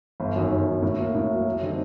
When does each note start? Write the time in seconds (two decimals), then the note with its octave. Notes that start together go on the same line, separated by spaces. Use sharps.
0.20 G1
0.36 F#2 D#3
0.52 G1
0.66 F#2 D#3
0.82 A2
0.99 F#3 A#3
1.15 A2
1.30 F#3 A#3
1.46 F#2
1.62 D3 G3 C4 D#4